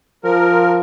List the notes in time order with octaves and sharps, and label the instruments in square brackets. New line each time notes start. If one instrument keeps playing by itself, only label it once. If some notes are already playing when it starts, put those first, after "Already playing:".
[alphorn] F3 [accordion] A#4